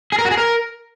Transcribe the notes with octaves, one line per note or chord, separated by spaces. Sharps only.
G#4
A#4
F#4
G#4
A#4